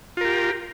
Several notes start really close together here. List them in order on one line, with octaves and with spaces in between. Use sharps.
F4 A#4 G4